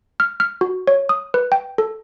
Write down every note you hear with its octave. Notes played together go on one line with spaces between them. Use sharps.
F6
F6
F#4
C#5
D#6
B4
G5
A4